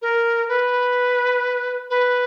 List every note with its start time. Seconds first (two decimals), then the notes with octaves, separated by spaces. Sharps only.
0.02 A#4
0.49 B4
1.90 B4